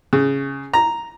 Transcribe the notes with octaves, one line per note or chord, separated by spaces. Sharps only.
C#3
A#5